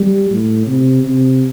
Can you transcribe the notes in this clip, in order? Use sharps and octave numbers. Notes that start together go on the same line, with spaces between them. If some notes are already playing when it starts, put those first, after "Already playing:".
Already playing: G3
A2
C3
C3